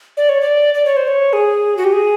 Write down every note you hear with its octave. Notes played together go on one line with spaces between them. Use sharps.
D5
C#5
D5
D5
C#5
C5
C#5
G#4
F#4
G4
G#4